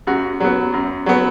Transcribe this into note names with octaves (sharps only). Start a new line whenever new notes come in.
F#2 F#4
F#3 B3
F#2
F#3 B3